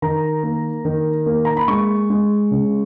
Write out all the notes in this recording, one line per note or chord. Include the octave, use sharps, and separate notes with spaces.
D#3 A#5
A#3
D#3
A#3
A#5
B5
G#3 C#6
G#3
C#3